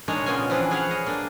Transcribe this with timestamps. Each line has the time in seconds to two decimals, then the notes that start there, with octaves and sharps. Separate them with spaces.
0.08 G#3 A#3 D4 D#4 C#5 D#5
0.26 A#2 C#3 B3 C#4 F4 G#5
0.50 E3 F3 C4 D4 B4
0.71 G#4 C#5 F5 F#5
0.91 D#5
1.06 A#3 D4